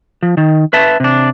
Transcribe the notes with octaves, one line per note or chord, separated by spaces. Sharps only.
F3
D#3
B4 E5 A5
C3 D4